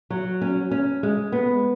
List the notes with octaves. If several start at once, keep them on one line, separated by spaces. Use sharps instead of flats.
F#3
C#4
C#4
G#3
B3